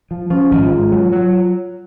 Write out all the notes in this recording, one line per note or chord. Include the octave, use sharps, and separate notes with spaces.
F3
F3 C#4
G#1 F4
G#2
F#3
F#3